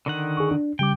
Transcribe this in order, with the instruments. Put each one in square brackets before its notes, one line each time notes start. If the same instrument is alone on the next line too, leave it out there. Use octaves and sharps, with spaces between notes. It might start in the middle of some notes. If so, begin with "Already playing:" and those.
[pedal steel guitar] D3 D#3 F#5
[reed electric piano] G#4 C#6
D4
[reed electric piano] C#3 G3 D6 [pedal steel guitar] G5